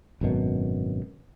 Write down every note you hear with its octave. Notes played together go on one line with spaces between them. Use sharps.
G#1 F#2 B2